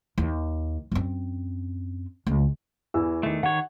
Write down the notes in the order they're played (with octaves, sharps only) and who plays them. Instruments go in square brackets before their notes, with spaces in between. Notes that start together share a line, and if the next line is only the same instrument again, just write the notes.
[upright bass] D#2
F#2 C4
C#2
[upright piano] E2 E3 E6
[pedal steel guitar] D#3 A3
[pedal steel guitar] D#3 C#5 [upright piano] F#5